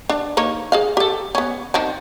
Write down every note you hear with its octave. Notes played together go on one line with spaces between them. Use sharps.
D4
A#3 D#4 C#5
G#4 D#5 F5
G4 A4
B3 C#4
D#3 C4 D4